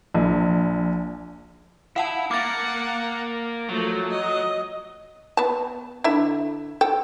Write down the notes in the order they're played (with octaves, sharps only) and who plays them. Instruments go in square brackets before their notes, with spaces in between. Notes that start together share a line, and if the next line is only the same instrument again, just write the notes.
[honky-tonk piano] A#1
[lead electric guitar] E4 [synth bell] F5 F#5 A5
[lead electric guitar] A#3 A#4 [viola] F#5 [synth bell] D6 A6
[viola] F3 A3 [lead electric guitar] F#3
[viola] D#5
[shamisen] B3 A5
D3 E4 E5
A4 G5